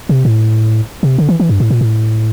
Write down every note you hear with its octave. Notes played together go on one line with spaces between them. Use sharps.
C3
A2
C3
D3
E3
E3
G2
A2
A#2
A2